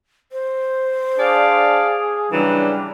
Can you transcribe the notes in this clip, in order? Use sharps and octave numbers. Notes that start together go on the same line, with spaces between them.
C5
D4 G#4 D5 F5
C#3 E3 F#3 G3 D4